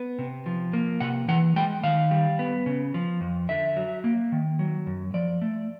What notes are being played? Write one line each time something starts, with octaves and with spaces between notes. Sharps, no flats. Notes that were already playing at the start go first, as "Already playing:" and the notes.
Already playing: B3
C3
F3
A#3
C3 F#5
E3 F#5
G#3 G5
D#3 F5
G3
B3
C#3
F3
F2
D3 E5
F#3
A#3
D#3
F#3
F#2
F3 D5
A3